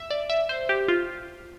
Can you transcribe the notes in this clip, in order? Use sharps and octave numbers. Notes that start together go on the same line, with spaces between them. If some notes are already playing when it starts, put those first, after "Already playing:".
Already playing: E5
D5
E5
C5
G4
F4